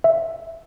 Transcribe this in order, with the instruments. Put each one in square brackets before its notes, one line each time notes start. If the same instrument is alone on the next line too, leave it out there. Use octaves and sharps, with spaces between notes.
[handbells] E5